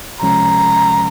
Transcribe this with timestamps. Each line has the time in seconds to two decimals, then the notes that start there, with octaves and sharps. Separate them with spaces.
0.21 C#2 C3 F3 G#3 C#4 A#5